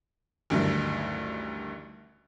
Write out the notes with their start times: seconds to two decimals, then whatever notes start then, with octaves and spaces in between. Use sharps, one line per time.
0.50 A1 D2 G2 D#3 F#3